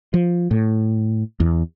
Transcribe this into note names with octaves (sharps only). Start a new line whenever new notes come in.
F3
A2
E2